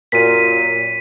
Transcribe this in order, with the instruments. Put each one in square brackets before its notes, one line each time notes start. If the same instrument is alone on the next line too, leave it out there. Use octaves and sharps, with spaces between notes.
[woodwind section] F#2 A#2 [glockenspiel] B6 D#7